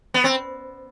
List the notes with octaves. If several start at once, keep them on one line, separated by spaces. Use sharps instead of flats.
B3
C4